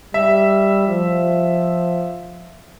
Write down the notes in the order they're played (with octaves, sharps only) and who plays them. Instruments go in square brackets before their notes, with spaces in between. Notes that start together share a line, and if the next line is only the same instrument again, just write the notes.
[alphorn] G3 [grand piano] E5
[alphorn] F3